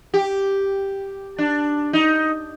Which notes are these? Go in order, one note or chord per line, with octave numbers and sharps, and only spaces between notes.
G4
D4
D#4